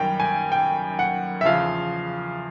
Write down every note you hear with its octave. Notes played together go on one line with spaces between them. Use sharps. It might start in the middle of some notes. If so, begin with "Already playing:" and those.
Already playing: F#2 D#3 G3 G5
G#5
G5
F#5
E5
E2 C#3 F3 F5